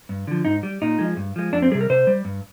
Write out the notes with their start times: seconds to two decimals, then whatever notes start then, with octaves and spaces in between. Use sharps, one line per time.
0.09 G2
0.27 D3 F3
0.45 G#2 D#4
0.63 G3
0.82 A#2 D#4
0.99 F3 G#3
1.17 G2
1.36 F3 G#3
1.53 F2 D4
1.62 C4
1.71 G3 G#4
1.74 C3
1.81 A#4
1.90 C3 C5
2.07 G3
2.25 G2